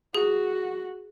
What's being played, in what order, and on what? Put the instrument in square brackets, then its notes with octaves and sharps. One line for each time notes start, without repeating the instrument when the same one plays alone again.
[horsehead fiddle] F#4 [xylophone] G#4